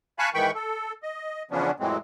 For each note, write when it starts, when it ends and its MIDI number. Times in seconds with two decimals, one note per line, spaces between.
0.19 0.29 77
0.19 0.29 80
0.19 0.29 81
0.19 0.29 83
0.19 0.29 85
0.19 0.29 90
0.34 0.51 44
0.34 0.51 51
0.34 0.51 52
0.34 0.51 79
0.34 0.51 83
0.34 0.51 85
0.55 0.93 69
1.03 1.43 75
1.51 1.71 40
1.51 1.71 49
1.51 1.71 53
1.51 1.71 59
1.51 1.71 61
1.51 1.71 62
1.80 1.97 41
1.80 1.97 45
1.80 1.97 52
1.80 1.97 54
1.80 1.97 56
1.80 1.97 60